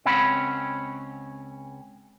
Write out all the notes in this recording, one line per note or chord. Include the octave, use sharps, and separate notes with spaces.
C#2 C4 C#4 F#5 B5